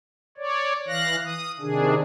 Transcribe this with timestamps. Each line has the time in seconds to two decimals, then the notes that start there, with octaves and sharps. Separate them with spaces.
0.38 C#5 D5
0.88 E3 F5 F#6 A#6
1.24 D#6
1.60 C3 D#3 D4 G#4